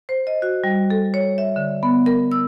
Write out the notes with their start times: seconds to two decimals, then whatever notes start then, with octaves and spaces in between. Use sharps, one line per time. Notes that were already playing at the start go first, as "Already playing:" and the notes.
0.09 C5
0.27 D#5
0.42 F#4
0.64 G3
0.90 A4
1.14 C#5
1.38 E5
1.56 D3
1.83 B3
2.06 A#4
2.32 E6